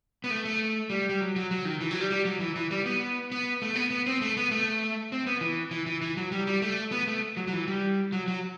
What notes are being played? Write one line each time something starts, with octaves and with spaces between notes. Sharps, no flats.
B3
A3
A3
G3
G3
F#3
F#3
F#3
D#3
E3
F#3
G3
G3
F#3
E3
E3
G3
B3
B3
A3
B3
B3
C4
A3
B3
A3
C4
B3
E3
E3
E3
E3
F#3
G3
G3
A3
B3
A3
F#3
F#3
E3
G3
F#3
F#3